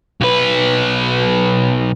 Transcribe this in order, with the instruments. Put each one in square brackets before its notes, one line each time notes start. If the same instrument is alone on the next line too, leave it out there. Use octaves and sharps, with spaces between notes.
[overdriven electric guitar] B1 B4